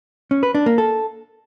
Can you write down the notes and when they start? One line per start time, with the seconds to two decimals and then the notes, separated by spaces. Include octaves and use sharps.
0.31 C#4
0.43 B4
0.55 D4
0.66 A#3
0.78 A4